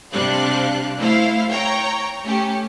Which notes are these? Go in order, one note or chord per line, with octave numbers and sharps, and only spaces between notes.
C3 G3 D4 F5 F#6
A3 E4 C5 F5
C#5 G5 A#5
A3 C#4 G4